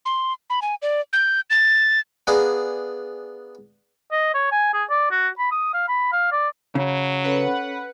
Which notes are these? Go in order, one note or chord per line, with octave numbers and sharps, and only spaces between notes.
C6
B5
G#5
D5
G6
A6
B3 D4 G#4 F5 A#5
D#5
C#5
G#5
G#4
D5
F#4
B5
D#6
F5
B5
F5
D5
C#3 F#3
C#4 A4 B4 C#5 F#5